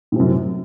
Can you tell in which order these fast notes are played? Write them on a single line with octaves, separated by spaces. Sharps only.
A2 C3 F#2